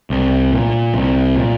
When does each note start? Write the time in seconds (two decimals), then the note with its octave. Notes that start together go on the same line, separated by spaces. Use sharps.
0.10 C2
0.52 A#2
0.94 C2
1.36 A#2